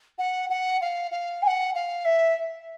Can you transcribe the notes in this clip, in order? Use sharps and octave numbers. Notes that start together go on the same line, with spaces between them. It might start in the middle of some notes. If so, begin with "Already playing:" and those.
F#5
F#5
F5
F5
G#5
F#5
F5
E5